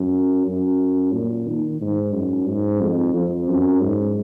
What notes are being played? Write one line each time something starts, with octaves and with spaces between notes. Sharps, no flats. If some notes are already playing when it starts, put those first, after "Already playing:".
Already playing: F#2
F#2
A#2
D#3
G#2
F#2
G#2
F2
F2
F#2
G#2